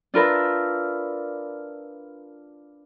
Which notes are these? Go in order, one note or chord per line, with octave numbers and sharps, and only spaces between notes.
D4 F4 A#4 B4 E5